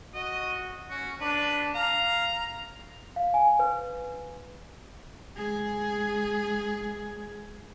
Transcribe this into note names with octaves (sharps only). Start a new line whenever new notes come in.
F#4 D#5
C#4 F#4
D4 B4
F5 A#5
F5
G#5
B4
G#3 G#4